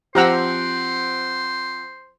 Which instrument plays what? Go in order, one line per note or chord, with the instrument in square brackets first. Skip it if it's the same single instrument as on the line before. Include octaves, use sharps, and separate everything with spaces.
[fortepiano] F3 C4 F#5 [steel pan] G4 A#5 E6 [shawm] C5